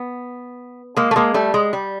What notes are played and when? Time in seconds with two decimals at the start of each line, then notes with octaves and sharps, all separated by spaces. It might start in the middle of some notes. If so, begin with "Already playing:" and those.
Already playing: B3
0.97 G#3 A#3
1.11 A3
1.16 G#3 A#3
1.34 G3 A3
1.54 G#3
1.73 G3